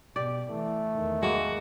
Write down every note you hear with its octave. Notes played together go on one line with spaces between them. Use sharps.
B2 G4 D5
E3 A3
E2 D#3
G#3 A#3 F#4